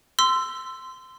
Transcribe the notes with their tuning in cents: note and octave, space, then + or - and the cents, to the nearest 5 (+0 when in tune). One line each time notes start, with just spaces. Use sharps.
C6 -15 E6 +15